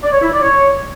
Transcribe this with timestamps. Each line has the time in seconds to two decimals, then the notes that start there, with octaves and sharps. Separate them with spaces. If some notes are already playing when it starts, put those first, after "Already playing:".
0.03 D5
0.12 C#5
0.22 E4
0.32 D5
0.42 C#5